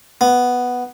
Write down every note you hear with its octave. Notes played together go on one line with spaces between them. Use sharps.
B3